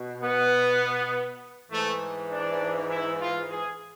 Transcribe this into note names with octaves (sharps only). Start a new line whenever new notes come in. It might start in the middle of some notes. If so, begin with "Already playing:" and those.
Already playing: B2
B3
G#2 E3 A3
D4
E4
F4
G#4